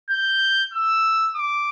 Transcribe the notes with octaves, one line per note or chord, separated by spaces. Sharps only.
G6
E6
D6